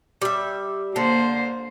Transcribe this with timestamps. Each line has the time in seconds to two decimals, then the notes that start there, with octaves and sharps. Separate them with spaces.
0.22 G3 E5
0.96 D3 A#3 C5